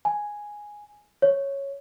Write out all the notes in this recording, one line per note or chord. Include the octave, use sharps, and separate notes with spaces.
G#5
C#5